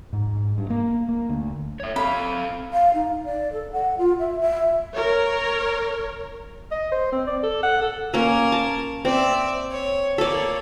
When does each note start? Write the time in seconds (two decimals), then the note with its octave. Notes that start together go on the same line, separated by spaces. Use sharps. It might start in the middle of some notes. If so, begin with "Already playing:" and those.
0.13 G#2
0.58 G2
0.70 A#3
1.09 A#3
1.29 D2
1.80 C#5 E5
1.96 C4 A4 F5 B5
2.73 F5
2.94 D#4
3.24 D5
3.52 A4
3.72 F#5
3.98 F4
4.19 E5
4.40 E5
4.93 A#4 C#5
6.71 D#5
6.92 C5
7.12 C4
7.27 D5
7.43 A4
7.63 F#5
7.81 A4
8.14 A#3 C#4 A#4
8.52 A5
9.05 C4 D5 E5
9.71 C#5
10.18 A#3 A4 C#5 D5